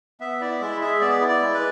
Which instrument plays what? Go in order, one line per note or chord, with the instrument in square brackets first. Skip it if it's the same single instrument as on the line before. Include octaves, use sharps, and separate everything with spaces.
[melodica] B3 [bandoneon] E5
[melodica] E4 [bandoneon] D5
[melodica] G#3 [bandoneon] E5
[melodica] G#4 [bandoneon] E5
[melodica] B3 [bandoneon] D5
[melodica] E4
[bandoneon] D5
[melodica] G#3
[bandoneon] B4